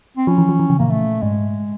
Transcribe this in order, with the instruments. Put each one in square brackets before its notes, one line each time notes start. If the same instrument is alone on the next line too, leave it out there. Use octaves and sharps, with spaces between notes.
[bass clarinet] C4
[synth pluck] F3 [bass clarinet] C#4
[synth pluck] E3
F3
E3
C#3
[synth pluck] A#2 [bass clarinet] A#3
[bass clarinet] A3
[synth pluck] G#2 [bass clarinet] G#3